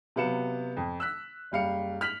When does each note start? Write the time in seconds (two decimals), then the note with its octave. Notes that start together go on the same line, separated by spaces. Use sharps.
0.16 C3 F#3 B3 F5 C#7 E7
0.77 F2
1.00 E6 F#6 B6
1.52 F#1 G3 F5 C#7
2.01 F6 B6 F7 F#7